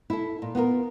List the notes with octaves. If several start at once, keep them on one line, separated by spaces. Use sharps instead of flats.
E4 A4
A#2
B3 F4 F#4 A#4